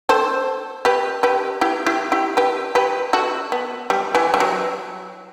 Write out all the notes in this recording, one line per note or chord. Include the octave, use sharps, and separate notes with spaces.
A4 C5
G4 B4
G4 B4
E4 G4
E4 G4
E4 G4
G4 B4
G4 B4
F#4 A4
B3
G3
E3
G3
F#3